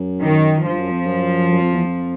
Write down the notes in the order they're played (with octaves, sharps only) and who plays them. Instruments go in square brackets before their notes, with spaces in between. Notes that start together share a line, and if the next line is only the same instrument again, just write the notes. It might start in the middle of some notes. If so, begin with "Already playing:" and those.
Already playing: [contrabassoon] F#2
[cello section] D#3
[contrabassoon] G2 [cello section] F3
[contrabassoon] F#2
F2
F#2
F#2
F2
E2
F2